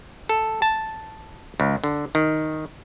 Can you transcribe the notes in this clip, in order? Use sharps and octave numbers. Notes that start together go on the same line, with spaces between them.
A4
A5
C#2
D3
D#3